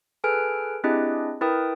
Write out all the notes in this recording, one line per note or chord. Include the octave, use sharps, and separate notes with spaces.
G#4 A4 B4 G#5 F6 D7
C4 D4 E4 G4 G#4 D#5
E4 A#4 B4 G5 D#6